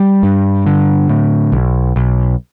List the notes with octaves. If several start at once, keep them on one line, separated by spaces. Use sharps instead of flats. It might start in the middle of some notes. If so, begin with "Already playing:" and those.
Already playing: G3
G2
D3
A2
B1
B1